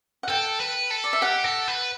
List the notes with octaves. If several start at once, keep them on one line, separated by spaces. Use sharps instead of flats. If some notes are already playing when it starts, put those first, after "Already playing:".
F#5
A4 G5
B4
A4
D5
E5
G4 F#5
A4
B4